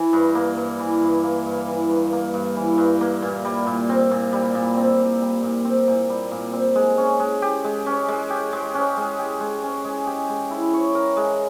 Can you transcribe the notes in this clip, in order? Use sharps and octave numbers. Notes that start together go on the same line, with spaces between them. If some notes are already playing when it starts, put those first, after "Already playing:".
Already playing: E3
G2
A#3
G2
E3
G2
A#3
G2
E3
G2
A#3
G2
E3
G2
A#3
A#2
G3
A#2
C4
A#2
G3
A#2
C4
A#2
G3
A#2
C4
A#2
G3
A#2
C4
G#3
C#4
G#3
G4
G#3
C#4
G#3
G4
G#3
C#4
G#3
G4
G#3
C#4
G#3
G4
G#3
E4
C#5
A#4
G#3